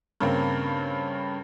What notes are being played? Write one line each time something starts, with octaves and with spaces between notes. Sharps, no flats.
G2 C#3 A#3 C4